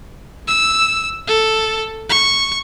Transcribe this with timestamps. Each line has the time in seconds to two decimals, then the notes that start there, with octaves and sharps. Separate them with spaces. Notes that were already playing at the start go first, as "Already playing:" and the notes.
0.47 E6
1.28 A4
2.09 C#6